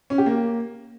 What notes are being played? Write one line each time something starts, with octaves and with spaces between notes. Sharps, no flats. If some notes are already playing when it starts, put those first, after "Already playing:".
C#4
G4
A#3